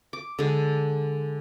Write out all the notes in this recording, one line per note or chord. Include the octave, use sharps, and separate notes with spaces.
D6
D3 G#3